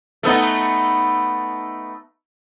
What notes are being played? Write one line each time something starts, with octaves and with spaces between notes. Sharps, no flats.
A3 B3 D#4